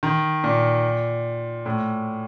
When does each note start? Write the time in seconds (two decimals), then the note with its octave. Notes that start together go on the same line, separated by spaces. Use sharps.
0.03 D#3
0.44 A#2
1.66 A2